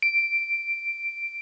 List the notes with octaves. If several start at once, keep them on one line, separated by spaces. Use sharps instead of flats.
D7